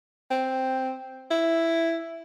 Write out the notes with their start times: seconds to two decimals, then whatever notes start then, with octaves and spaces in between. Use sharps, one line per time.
0.31 C4
1.31 E4